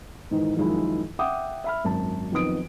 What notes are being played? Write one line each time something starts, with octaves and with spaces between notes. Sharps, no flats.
G#2 D#3 E3
F#2 D#3 F3 G#3 D#4 E4
E5 F#5 G5 D6 D#6
E5 B5 F6
G#1 F#2 A5
B1 F2 D#3 B3 D#6 D7